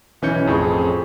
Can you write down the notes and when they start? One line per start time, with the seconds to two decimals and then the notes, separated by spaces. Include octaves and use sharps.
0.22 B1 E3 C#4 G6 C#7
0.46 A1 F2 G#4 C5 C#6